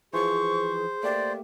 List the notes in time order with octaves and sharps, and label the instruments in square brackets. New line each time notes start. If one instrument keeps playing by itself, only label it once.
[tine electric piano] E3 F3 [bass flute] G#4 [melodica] C5 [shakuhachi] C#6
[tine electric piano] A3 A#3 G4 [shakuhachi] D5